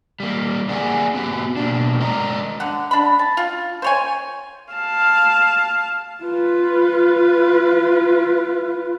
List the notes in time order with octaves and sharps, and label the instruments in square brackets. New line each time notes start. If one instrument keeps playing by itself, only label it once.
[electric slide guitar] G3 A#3
A#3 D4 G#4 D5 F#5 G#5
B3 F#4 G4
B2 A#3 D4
G#3 A#4 D5 D#5 A#5
[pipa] D3 F#5
D4 B5
A5
F4
C5 C#5 G#5
[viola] F5 A5
[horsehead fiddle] F4 B4